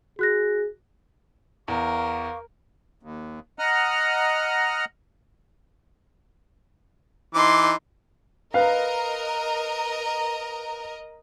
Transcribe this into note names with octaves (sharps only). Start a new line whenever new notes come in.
F#4 G#4 F#6 A#6
E2 A#4 F5 C#6 D6
D#2
D#5 F#5 A#5 F6
E3 D#4 C6 D6
A#4 B4 D#5 F5 A#5